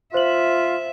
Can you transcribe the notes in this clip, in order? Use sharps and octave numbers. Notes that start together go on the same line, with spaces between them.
F4 C5 E5 F#7